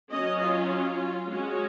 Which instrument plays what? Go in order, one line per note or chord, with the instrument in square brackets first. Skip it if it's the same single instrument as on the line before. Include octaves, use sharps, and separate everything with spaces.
[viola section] F#3 C#4 D#5
F4
F4
G#3 C#4 F#4